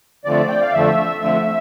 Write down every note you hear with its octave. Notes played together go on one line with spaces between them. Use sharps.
F2 D3 F3 A3 D5
G5
F5
F2 D3 F3 A3 E5
F2 D3 F3 A3 E5